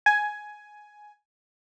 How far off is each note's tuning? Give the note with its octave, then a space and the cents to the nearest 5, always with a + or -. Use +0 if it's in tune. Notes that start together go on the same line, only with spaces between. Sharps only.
G#5 +10